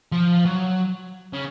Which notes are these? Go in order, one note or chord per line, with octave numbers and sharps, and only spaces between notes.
F3
F#3
C#3